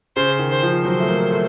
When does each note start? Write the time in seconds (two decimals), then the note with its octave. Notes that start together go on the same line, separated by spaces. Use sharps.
0.16 C#3 C5
0.39 D#3
0.51 C5
0.63 F3
0.85 F#3 C5
1.00 A3
1.08 A#3
1.31 A3